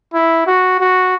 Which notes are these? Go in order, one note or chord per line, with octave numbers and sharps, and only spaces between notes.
E4
F#4
F#4